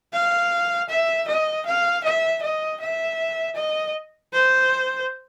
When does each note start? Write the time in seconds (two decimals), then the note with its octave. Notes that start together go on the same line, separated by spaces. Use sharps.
0.13 F5
0.89 E5
1.28 D#5
1.66 F5
2.04 E5
2.42 D#5
2.80 E5
3.56 D#5
4.33 C5